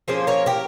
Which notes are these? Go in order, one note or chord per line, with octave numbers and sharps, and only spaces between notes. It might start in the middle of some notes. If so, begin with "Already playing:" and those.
F3 A#3 C#4 G#4 C5
A#4 C#5
G4 A#4